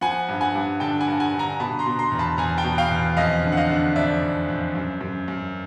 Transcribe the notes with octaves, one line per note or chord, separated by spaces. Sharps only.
F3 F#5 G#5
G2
F#5 G#5
G2
D3 G5 A5
F#5 G#5
G2
F#5 G#5
D3
G#5 A#5
B2 A5 B5
A#5 C6
B2
A#5 C6
E2
A5 B5
E2 G#5 A#5
G5 A5
B2
F5 G5
E2
F2 D#5 F5
D3
F#5
D#5 F5
D3
F2 D5 E5
F2
F2
F#2
F#2
F#2